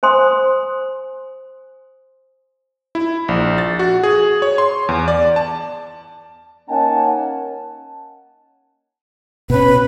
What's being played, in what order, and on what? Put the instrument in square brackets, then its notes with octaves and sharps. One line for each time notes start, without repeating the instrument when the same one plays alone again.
[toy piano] C5 G#5 C6 D#6
[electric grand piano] E4
A#1
A6
F#4
G#4
C#5
C6
E2
D5
A5
[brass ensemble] A#3 C#4 D#4 F#5 G#5 A5
[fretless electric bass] B2 C#4 [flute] B4